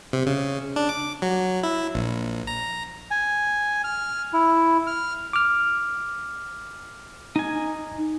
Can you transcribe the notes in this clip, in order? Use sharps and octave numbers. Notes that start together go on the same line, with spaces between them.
C3
C#3
D4
D6
F#3
E4
A#1
A#5
G#5
F6
E4
F6
D6 F6
D#4 G#5